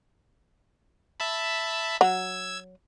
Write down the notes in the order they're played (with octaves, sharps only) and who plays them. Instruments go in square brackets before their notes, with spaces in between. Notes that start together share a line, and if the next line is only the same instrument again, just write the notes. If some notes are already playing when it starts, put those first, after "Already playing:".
[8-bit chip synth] E5 A5 B5
[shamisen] F#3 [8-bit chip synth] E6 G#6